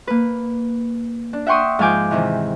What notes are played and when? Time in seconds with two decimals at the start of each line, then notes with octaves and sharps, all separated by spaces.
0.07 A#3 B4
1.33 D4
1.46 E5 F#5 G5 C6 C#6 D#6
1.79 G#2 F3 F5 G#5 D6 G6
2.11 C3 D#3 E3